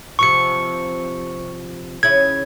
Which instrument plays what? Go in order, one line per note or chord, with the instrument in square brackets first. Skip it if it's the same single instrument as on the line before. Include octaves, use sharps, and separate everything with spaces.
[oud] C3 F3 C4 [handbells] C#6 C#7
[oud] C#3 C#4 E4 [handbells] G#6